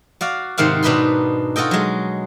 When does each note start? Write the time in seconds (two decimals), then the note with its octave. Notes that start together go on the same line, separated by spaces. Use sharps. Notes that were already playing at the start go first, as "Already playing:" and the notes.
0.21 F#4 D5 F5
0.58 G#2 C3 D#3 C4 F5 F#5
0.83 B2 D4 D#4 B4 B5 C6
1.56 F4 F#4 A4 D#5 G5
1.71 F#3 G#3